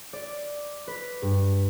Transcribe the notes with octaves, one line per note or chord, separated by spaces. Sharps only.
D5
B4
G2